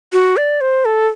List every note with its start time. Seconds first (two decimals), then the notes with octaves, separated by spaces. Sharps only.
0.13 F#4
0.37 D5
0.61 C5
0.85 A4